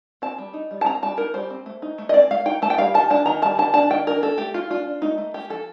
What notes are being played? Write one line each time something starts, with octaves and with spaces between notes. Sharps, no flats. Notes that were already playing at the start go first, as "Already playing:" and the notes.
C4 A5
G3
D#4
G3
A5
C4 A#5
G3 A5
D#4 A#4
G3 C5
C4
A3
D#4
A3
D#5
C4 D5
A3 F5
D#4 G5
A3 A5
G5
G3 F5
D#3 A5
D4 A5
D#3 A#5
G3 A5
D#3 A5
D4 A5
D#3 G5
D4 A#4
D4 A4
A3 G4
A3 F4
D4 F4
D4
A3 D#4
A3
A3 G4
F3 A4